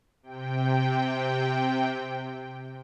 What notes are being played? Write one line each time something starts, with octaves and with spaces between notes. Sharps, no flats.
C3 G5